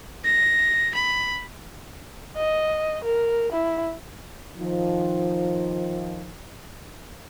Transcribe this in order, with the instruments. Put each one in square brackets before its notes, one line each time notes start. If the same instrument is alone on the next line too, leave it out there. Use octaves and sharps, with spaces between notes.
[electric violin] A#6
B5
[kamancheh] D#5
A#4
E4
[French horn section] D#3 F3